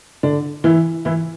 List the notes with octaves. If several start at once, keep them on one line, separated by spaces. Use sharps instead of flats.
D3 D4
E3 E4
E3 E4